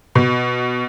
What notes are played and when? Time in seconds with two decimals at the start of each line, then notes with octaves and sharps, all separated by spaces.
0.15 B2